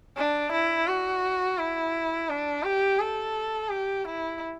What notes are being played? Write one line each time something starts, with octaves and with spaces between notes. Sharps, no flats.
D4
E4
F#4
E4
D4
G4
A4
G4
E4